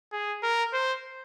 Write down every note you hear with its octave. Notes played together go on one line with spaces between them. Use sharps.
G#4
A#4
C5